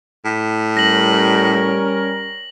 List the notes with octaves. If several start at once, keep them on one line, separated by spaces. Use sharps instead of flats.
A2
G3 C#4 A#4 A#6 F#7